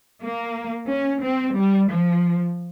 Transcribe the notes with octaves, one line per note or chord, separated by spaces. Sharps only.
A#3
C#4
C4
G3
F3